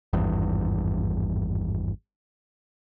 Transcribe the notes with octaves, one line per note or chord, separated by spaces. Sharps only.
G#1 E2 G2